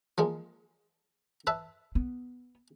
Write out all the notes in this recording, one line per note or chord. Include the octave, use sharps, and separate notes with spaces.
F3 G#3 A#3
B4 E5 A5
B3